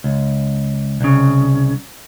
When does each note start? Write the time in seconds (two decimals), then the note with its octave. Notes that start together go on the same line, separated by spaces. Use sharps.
0.04 C#2
1.01 C2 C#3